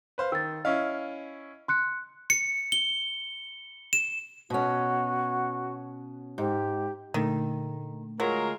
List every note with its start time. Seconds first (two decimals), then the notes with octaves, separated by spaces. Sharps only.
0.18 B4 C5 F5
0.32 D#3 E6 A6
0.65 C#4 E4 D#5 F5
1.68 C6 F#6 C#7
2.30 C#7
2.72 G7
3.93 E7
4.50 B2 C#4 F#4
6.38 G#2 G4
7.14 A#2 D3 D#3 A3
8.20 F#3 G#3 F4 A#4